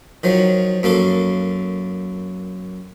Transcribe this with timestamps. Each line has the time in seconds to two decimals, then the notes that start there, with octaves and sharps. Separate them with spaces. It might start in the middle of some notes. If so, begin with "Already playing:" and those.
0.23 D#3 F3 F#3
0.83 F#2 A#3 F#4 A4 C6